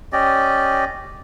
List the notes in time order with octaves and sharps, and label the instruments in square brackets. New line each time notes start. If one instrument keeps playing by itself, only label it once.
[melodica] C#4 G4 D5 D#5